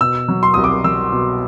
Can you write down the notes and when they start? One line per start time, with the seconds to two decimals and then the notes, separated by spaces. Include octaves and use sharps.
0.01 B2 E6
0.28 F#3
0.43 C6
0.54 C2 D#6
0.64 D6
0.84 F#3 E6
1.12 B2